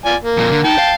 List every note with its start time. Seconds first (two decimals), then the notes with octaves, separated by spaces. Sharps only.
0.05 F4 D5 G#5
0.21 A#3
0.37 F2 A#2
0.52 D3
0.65 D#4 G5 A5
0.78 F5